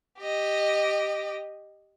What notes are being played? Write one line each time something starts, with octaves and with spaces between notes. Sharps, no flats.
G4 D#5